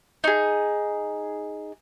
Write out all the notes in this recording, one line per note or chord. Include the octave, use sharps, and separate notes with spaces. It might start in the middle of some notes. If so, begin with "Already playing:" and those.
D#4 G#4